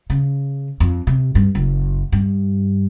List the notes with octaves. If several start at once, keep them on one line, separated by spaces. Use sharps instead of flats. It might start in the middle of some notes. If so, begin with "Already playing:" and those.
C#3
F2
C3
G2
F#1
G2